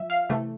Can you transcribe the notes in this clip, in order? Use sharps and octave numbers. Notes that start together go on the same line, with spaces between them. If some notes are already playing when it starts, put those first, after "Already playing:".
Already playing: F3 E5
F5
C3 E3 A3